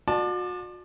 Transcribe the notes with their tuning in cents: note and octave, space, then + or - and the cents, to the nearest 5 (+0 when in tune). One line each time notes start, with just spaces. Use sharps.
F#4 -40 D5 +35 A5 +0